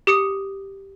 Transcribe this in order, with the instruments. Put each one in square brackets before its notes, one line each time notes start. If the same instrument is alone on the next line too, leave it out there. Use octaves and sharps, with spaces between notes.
[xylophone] G4 D#6 C#7